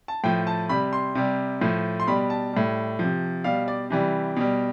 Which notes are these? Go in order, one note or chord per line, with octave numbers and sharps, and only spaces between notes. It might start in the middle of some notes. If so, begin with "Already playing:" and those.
A5
A2 F3 G5
A5
C3 G3 B5
C6
C3 G3
A2 F3
C6
B2 G3 B5
A5
A2 G3
C3 F3
B2 G3 F5
D5
C3 E3 G3
B2 G3